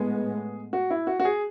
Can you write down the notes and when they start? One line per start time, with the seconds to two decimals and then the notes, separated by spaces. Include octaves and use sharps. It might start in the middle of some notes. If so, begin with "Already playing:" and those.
Already playing: A2 G#3 B3 G#4
0.73 F#4
0.90 E4
1.07 F#4
1.20 F#4
1.25 G#4